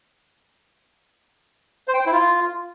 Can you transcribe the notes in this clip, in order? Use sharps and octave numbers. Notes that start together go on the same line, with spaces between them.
C5
G5
C5
E4
F4